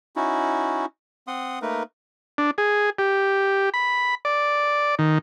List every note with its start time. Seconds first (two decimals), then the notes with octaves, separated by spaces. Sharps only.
0.16 C#4 D#4 E4 F#4
1.27 C4 F#5 C6 D#6
1.62 A3 A#3 D#4 A#4 B4
2.38 D4
2.58 G#4
2.98 G4
3.74 B5
4.25 D5
4.99 D#3